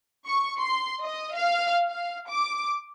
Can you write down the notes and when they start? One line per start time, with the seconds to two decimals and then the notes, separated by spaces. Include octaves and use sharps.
0.27 C#6
0.60 C6
1.03 D#5
1.37 F5
1.89 F5
2.30 D6